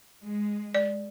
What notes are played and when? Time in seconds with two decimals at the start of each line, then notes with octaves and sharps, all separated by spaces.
0.23 G#3
0.75 D5